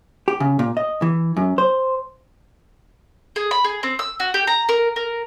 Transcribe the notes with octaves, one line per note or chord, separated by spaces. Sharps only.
G4
C#3
A#2
D#5
E3
F#2
C5
G#4
B5
G#4
C4
E6
F#4
G4
A#5
A#4
A#4